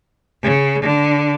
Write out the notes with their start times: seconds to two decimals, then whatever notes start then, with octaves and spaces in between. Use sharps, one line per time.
0.43 C#3
0.82 D3